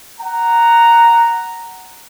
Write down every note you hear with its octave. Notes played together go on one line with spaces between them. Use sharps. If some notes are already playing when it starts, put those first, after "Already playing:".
F#5 A#5